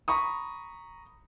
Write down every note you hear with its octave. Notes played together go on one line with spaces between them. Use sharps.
A#5 B5 C#6 D#6